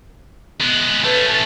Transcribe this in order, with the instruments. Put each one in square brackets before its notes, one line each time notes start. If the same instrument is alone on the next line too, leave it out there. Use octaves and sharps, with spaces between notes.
[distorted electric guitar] G#3 B3
[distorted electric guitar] A3 C#4 [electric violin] B4 A5